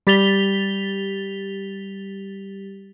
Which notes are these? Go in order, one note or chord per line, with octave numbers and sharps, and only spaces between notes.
G3 G4 A6 B6 F7 G7